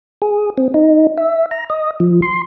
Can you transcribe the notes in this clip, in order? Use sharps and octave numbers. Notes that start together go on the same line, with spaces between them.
G#4
C4
D#4
E5
A#5
D#5
F3
C6